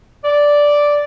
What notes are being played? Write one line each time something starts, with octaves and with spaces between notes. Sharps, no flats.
D5